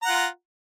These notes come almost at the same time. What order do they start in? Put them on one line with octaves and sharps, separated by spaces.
A#5 F#5 F4